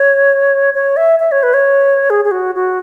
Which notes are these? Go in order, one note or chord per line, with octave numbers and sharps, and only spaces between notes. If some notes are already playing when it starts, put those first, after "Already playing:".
Already playing: C#5
C#5
E5
E5
C#5
B4
C#5
G#4
G#4
F#4
F#4